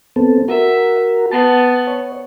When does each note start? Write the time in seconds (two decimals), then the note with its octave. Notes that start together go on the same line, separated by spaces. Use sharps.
0.16 B3 C4 A4
0.48 F#4 A#4 E5
1.31 B3 A5
1.87 C#5